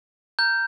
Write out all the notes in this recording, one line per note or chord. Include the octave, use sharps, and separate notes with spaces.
A#5 F6 G6